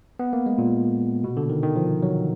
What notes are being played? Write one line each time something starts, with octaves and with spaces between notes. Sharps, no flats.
B3
A#3
G#3
A#2
B2
D3
D#3
D#3
F3
F#3